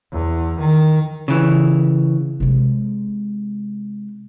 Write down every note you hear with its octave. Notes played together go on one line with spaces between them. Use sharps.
E2
D#3
C#3 E3
C3 G#3